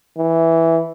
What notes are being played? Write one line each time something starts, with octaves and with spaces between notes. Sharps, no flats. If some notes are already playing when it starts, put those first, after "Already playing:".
E3